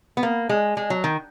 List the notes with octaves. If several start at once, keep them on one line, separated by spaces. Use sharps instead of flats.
B3
A#3
G#3
G#3
F#3
D#3